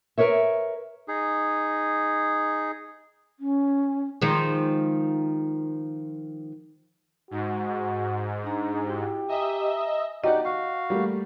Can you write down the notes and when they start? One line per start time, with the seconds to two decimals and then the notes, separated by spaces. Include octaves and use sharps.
0.18 A#4 B4 C#5 E5
1.08 D#4 G#4
3.40 C#4
4.22 D#3 F3 G#3
7.31 G#2 F#4
8.44 D4 D#4 A#5
8.87 E4 F#4 G4
9.28 D#5 E5 G#5 A#5 D#6
10.24 D#4 F#4 G4 D5 D#5 F#5
10.45 F#4 F5 C#6
10.90 G3 A3 A#3